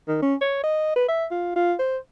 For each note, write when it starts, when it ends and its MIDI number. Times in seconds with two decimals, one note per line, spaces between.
0.08 0.18 51
0.22 0.35 61
0.41 0.61 73
0.64 0.95 75
0.96 1.06 71
1.08 1.25 76
1.31 1.54 65
1.56 1.74 65
1.79 1.98 72